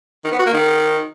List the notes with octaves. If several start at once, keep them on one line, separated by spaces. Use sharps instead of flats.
D#3
B3
F#4
A#3
D#3